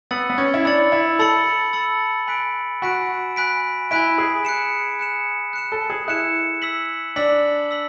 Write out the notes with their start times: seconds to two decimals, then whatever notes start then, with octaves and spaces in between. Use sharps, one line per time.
0.11 B3 B5 E6 A6 C#7 F#7
0.30 B3
0.38 C#4
0.54 E4
0.65 D4 B5 E6 A6 C#7 F#7
0.92 E4
1.19 A4 B5 E6 A6 C#7 F#7
1.73 B5 E6 A6 C#7 F#7
2.27 G#5 B5 F#6 B6 D7
2.82 F#4 G#5 B5 F#6 B6 D7
3.36 G#5 B5 F#6 B6 D7
3.91 E4 G#5 B5 F#6 B6 D7
4.18 G#4
4.45 F#6 C#7 E7
4.99 F#6 C#7 E7
5.53 F#6 C#7 E7
5.72 A4
5.90 G#4
6.08 E4 F#6 C#7 E7
6.62 E6 B6 F#7
7.16 D4 E6 B6 F#7
7.71 E6 B6 F#7